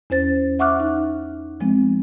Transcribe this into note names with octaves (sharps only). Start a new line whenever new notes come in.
E2 C#4 C5 A6
E5 F#5 C#6 D6 F6 F#6
D#4
F3 G#3 B3 C4